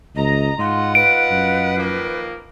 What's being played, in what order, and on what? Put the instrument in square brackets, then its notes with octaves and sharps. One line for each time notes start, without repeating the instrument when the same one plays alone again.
[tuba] C#2 [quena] D#5 [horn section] A#5
[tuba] G#2 [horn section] F4 D#5 F#5 [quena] C6
[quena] B4 [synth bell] D7
[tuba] F#2
[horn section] D#3 F3 A#3